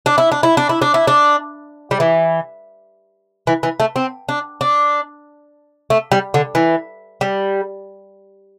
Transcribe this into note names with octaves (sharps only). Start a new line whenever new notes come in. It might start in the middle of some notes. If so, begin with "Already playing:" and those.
D4
E4
D4
E4
D4
E4
D4
E4
D4
G3
E3
E3
E3
A3
C4
D4
D4
A3
G3
D3
E3
G3